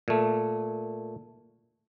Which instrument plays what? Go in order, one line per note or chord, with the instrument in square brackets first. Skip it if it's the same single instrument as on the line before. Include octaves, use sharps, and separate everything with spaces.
[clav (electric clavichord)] A#2 A3